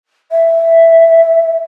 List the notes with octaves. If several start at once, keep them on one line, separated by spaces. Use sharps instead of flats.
E5